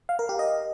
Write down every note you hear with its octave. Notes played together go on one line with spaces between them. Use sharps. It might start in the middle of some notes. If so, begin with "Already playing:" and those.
F5
A#4
G4
D#5